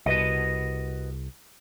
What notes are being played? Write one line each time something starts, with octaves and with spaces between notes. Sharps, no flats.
C2 F#4 B4 D#5